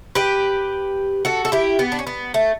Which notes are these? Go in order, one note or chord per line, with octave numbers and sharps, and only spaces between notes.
G4 B4
F#4 A4
A4
E4 G4
B3
D4
C#4
B3
A3